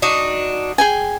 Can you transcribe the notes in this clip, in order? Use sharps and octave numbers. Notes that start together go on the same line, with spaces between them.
D4 D#4 F#4
G#4 G5 G#5